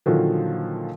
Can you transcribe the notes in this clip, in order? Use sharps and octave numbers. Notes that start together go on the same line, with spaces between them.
A#2 D3 D#3 F3 F#3